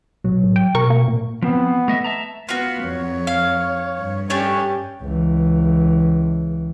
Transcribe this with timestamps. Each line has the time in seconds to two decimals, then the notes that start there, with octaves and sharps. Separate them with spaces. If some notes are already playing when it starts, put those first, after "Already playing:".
0.24 B1 F#3
0.43 A2
0.56 G5
0.75 B2 A#4 C#6
0.90 A#3
1.08 A#2
1.42 F3 B3 C4
1.88 A3 D#5 E5
2.04 E5 A5 A#5
2.49 B3 F4 F#4
2.84 F2 C#5
3.27 F5
4.00 G2
4.30 A3 C#4 D4 G4 C#5
5.01 C#2 E3